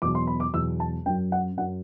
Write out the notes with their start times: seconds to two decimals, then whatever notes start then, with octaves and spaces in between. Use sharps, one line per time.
0.02 E2 B2 F#3 D6
0.15 C6
0.27 B5
0.40 D6
0.53 E2 B2 F#3 E6
0.80 A5
1.06 F#2 F#3 G5
1.32 F#5
1.57 F#2 F#3 F#5